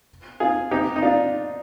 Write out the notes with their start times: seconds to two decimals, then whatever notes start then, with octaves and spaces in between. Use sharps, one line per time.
0.40 F4 G#4
0.71 D#4 G4
0.96 D#4
1.02 D4 F4